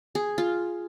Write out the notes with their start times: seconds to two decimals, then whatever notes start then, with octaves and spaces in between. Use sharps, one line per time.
0.15 G#4
0.38 F4